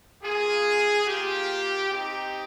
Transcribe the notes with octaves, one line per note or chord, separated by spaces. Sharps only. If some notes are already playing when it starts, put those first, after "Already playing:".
A#3 F4 G#4
A#3 F4 G4
C4 D#4 G4